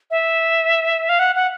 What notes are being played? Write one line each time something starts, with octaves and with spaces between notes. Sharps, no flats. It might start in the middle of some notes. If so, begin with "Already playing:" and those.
E5
F5
F#5
F#5